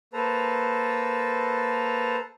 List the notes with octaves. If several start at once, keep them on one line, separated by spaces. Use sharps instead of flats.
A#3 A4 B4 C5 A5 A#5